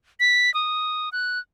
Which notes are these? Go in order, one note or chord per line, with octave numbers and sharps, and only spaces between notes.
B6
D#6
F#6